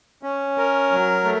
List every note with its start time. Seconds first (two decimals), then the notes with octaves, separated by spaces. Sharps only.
0.23 C#4
0.58 A#4
0.92 F#3
1.25 A3